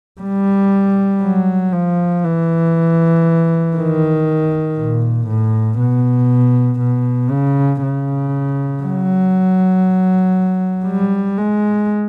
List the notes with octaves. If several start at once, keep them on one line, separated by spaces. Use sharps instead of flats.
G3
F#3
F3
E3
D#3
A#2
A2
B2
B2
C#3
C#3
F#3
G3
G#3